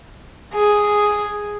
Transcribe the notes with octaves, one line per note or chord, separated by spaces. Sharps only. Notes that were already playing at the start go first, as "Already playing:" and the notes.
G#4